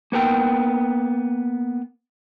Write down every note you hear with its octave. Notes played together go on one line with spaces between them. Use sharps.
A#3 B3 A#4 G5